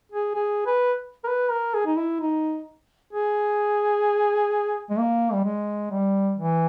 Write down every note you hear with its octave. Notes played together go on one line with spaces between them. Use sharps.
G#4
G#4
B4
A#4
B4
A#4
G#4
D#4
E4
D#4
G#4
G#3
A#3
G3
G#3
G3
E3